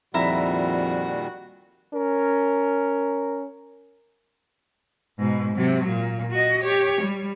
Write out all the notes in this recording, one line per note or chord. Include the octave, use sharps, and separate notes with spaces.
F2 A#2 D#3 G3 E4 F#4 E5 A#5
C#4 A#4
G#2 B2
C3 F#3
A#2
F#4 D#5
G4 C#5
G3